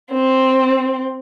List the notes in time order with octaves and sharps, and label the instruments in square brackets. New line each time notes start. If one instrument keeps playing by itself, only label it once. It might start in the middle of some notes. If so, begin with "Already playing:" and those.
[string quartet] C4